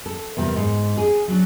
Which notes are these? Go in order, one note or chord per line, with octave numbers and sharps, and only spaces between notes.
A4
E2 C3 G3 A4 A#4
G#2
G#4
F#3 D4